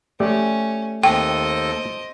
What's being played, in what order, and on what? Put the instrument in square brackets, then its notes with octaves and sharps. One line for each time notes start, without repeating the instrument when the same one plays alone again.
[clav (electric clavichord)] A3 G4 D5 [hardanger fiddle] C#4
[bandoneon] D#2 A4 [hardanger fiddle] C4 D#5 [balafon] G5